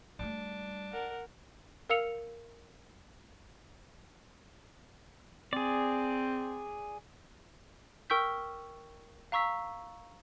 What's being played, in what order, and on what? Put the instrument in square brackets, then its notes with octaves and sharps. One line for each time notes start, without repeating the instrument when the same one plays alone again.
[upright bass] G3 A3 [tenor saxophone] D4
[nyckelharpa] A#4 [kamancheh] F#5
[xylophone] A#4 F5 E6 C#7 F7
[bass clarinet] C4 [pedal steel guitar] G#4 D5
[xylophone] A#4 G5 C#6 E6 G6 B6
F5 A#5 C#6 E6 B6